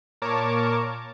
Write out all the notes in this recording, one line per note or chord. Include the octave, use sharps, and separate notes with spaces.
A#2 A#4 C#5 A5 D6